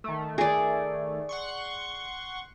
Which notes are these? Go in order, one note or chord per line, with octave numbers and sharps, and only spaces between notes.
D#3 A3
G#4 D5
F#5 C6 C#6